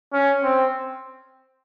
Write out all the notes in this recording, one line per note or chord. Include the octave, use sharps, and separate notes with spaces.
C#4
C4